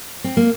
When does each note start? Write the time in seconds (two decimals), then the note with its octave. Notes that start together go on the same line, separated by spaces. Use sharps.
0.24 C4
0.37 A#3